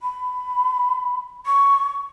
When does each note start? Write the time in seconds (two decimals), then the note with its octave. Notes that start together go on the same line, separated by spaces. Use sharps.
0.01 B5
1.46 C#6